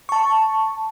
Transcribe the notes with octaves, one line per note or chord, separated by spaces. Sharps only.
A5 C#6